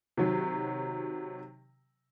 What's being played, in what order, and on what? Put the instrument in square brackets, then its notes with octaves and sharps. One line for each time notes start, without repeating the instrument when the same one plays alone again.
[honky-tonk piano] C3 D#3 F#3